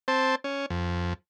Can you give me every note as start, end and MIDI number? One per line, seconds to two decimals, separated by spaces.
0.08 0.35 60
0.08 0.35 72
0.08 0.35 81
0.44 0.66 61
0.70 1.14 41